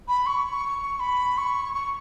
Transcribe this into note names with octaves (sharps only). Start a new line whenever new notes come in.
B5
C#6
B5
C#6
C#6